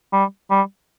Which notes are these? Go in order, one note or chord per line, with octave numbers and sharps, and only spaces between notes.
G3
G3